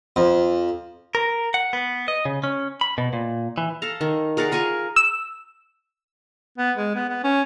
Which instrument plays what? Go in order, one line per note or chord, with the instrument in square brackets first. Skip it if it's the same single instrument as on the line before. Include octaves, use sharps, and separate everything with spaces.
[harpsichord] F2
[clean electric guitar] A#4
F#5
B3
D#5
C#3
C#4
B5
B2
A#2
E3
[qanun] A4 F5 A#5
D#3
G#4 A#4 D5 F#5
F4 A#4 G#5 C#6
[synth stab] E6
[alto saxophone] B3
G#3
B3
B3
C#4